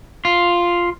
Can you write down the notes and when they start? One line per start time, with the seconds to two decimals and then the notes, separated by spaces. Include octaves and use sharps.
0.25 F4